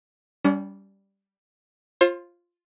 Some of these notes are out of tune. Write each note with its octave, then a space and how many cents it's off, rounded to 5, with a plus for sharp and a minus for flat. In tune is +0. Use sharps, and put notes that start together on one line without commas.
G3 +0 C#4 +40
F4 +0 C5 +35